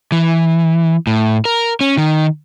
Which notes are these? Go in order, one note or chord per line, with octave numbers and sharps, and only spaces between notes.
E3
A2
A#4
C#4
D#3